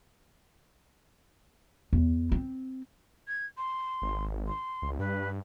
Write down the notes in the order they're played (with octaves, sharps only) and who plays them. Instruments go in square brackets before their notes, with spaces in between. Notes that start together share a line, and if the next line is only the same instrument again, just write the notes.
[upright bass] E2
C4
[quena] G#6
C6
[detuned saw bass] G#1
[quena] C6
[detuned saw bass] C#2
[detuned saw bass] G2 [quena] B4